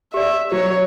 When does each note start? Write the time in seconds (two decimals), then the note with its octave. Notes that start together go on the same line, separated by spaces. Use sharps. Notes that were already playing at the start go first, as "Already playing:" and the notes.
0.14 G4 D5 E5
0.52 F#3 C#5